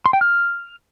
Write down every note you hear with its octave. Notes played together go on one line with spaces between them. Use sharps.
C6
G5
F6